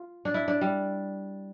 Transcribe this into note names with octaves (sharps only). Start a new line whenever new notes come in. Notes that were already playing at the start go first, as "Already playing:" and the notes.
Already playing: F4
D4
E4
D4
G3